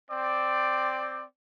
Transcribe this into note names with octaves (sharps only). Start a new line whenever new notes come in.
C4 D5